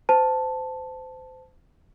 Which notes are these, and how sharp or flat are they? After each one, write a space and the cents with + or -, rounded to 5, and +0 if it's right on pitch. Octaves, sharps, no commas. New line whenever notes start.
C5 -30 A5 +0